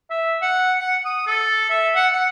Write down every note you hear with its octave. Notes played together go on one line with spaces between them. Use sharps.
E5
F#5
F#5
D#6
A4
E5
F#5
F#5